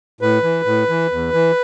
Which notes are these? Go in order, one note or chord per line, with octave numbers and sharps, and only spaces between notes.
A2 B4
E3
A2
E3
E2
E3